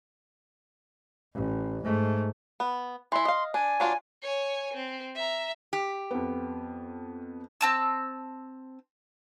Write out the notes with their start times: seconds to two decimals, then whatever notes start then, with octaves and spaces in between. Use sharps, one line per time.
1.34 A1
1.84 G#2 A3
2.60 B3
3.12 E3 E4 C6
3.25 D#5 F5
3.54 D4 G#5
3.80 F#3 D4 F4
4.22 C#5 G#5
4.74 C4
5.15 E5 A#5
5.73 G4
6.11 F2 B3
7.61 C4 A5 E6